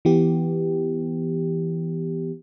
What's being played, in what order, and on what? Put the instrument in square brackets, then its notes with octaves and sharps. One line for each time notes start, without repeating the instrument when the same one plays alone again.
[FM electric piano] E3 B3 G4